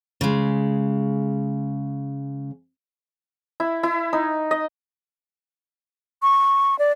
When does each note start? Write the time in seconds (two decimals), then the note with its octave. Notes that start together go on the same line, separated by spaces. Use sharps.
0.21 C#3 G#3
3.60 E4
3.83 E4
4.13 D#4
4.51 D#5
6.22 C#6
6.79 D5